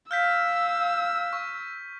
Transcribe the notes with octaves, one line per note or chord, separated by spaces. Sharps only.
F5 E6 F6 G6 B6
C#6